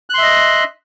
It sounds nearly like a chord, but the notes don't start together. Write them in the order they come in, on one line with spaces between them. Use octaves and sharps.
F#6 C6 E5 D#5